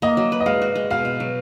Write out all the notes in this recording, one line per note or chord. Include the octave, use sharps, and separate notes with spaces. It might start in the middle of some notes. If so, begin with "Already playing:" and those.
A#3 D#5
F#3
B4
D#5
G#3 F5
F#4
G#3
B2 F5
B2
F#3